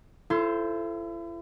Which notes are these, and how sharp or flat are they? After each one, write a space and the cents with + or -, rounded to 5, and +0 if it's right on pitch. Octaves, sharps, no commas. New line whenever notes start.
E4 +40 A4 +0 C5 +0